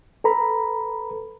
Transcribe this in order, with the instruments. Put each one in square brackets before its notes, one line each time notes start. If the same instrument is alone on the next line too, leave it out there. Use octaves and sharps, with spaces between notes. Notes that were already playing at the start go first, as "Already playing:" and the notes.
[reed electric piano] A4 B4 A#5 B5